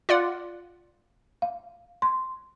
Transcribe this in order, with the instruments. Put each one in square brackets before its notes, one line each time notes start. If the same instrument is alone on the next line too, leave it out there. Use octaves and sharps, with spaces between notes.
[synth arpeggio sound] F4 D5 F#5
[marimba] F5
C6